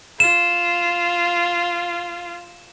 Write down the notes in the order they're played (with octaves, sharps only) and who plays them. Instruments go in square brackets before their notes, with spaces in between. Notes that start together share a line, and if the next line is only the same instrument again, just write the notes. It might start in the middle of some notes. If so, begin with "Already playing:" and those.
[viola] F4 [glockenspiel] E7